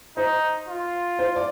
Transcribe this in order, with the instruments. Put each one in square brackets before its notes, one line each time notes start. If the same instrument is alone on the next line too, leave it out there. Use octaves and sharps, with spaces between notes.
[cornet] D#4 [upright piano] C5
[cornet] F4
[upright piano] C5
D5